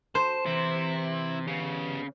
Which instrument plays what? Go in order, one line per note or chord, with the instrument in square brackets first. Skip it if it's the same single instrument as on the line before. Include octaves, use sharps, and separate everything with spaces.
[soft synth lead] F#4 [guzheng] C5 [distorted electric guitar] A5
[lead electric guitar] C3 [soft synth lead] E3 [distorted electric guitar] E4
[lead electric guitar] C#3 [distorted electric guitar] B3 G4